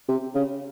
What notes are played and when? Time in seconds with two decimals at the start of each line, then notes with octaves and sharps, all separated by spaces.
0.09 C3
0.35 C#3